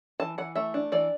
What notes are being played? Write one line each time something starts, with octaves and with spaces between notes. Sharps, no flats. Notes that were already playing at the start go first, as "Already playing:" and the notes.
E3 A5
E3 F#5
A3 E5
D4
E3 D5